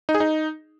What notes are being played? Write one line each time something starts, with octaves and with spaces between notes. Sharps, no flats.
D#4
G#4
D#4